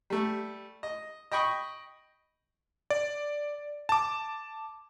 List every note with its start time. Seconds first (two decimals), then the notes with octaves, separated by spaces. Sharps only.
0.10 G3 A3
0.83 D#5
1.32 D#5 G5 B5 C#6 D#6
2.90 D5
3.89 A5 D6